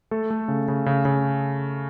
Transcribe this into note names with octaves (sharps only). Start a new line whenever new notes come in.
A3 A4
A3
C#3
C#3
C#3
C#3